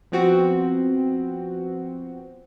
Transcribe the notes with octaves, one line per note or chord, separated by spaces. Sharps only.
F3 B3 C4 F#4